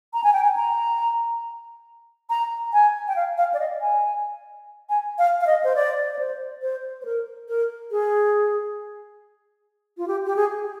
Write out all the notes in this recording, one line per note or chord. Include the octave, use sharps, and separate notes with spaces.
A#5
G#5
G5
G#5
A#5
A#5
G#5
G5
F5
F5
D5
D#5
G#5
G#5
F5
F5
D#5
C5
D5
D5
C5
C5
C5
A#4
A#4
G#4
F4
G4
G4
G#4